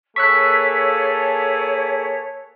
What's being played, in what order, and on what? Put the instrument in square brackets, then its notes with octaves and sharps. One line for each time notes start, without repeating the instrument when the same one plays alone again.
[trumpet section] A#3 G#4 A4 [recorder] C#5 [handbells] C#6 E6 F#6 [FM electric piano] B6